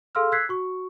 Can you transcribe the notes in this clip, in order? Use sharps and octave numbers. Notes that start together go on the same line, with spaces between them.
G#4 A4 F5 C6 E6 F6
E6 F#6 G#6 B6 C7
F#4 C#6